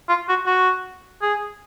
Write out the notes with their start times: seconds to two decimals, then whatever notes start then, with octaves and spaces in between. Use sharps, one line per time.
0.09 F4
0.29 F#4
0.47 F#4
1.22 G#4